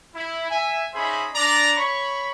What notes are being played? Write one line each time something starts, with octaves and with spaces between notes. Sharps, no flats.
E4
E5 G#5
C#4 D#4 G#4 C5 E5 B5
D4 D5 A#5
C#5 B5 C#6